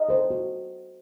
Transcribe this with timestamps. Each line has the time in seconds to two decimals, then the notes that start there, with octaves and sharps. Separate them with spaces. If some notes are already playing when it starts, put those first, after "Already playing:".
Already playing: D#5
0.09 A4 C5
0.30 F#4